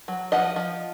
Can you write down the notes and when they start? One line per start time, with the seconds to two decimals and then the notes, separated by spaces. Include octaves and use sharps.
0.08 F#3
0.32 F3 D#5 F#5
0.56 F3